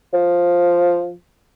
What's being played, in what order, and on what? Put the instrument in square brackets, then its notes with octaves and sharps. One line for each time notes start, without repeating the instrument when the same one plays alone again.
[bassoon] F3